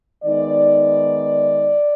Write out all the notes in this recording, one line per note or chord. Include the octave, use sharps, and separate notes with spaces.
D#3 G#3 B3 D#4 D5